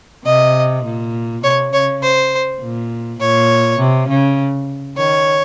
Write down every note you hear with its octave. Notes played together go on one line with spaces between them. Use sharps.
C3 D#5
A#2
C3 C#5
C#3 C#5
C5
A#2
A#2 C#5
C3
C#3
D#3 C#5